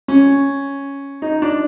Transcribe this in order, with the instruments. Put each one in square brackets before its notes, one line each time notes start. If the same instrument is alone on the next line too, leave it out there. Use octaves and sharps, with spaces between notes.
[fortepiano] C#4
D#4
D4